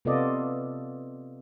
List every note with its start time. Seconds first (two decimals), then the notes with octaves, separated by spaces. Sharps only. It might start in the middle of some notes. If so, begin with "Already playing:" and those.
0.05 C3 B3 F4 A4 D5 D#5